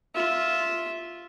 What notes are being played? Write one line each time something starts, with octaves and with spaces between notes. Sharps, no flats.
F4 E5